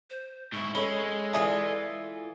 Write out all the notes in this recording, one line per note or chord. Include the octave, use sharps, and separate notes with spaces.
C5
G#2 E4 C#6
G#3 C#4 A4 C#5 B5
E3 F4 D5 E5 G#5 D#6